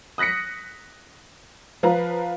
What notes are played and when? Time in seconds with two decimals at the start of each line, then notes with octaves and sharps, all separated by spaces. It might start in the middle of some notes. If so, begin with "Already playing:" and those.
0.18 D#6 F#6 A#6 B6 C#7
1.83 F3 B4 F5 A#5